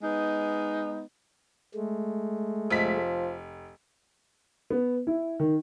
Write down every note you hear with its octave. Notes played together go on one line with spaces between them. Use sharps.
G#3 B3 D#4
G#3 A3
F1 F3 B6
B3
E4
D#3